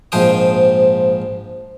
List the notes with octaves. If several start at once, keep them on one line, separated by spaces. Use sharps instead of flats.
A#1 G#2 F3 C5 G5 D#6